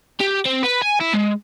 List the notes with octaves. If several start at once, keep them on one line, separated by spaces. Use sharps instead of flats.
G4
C4
B4
G#5
E4
G#3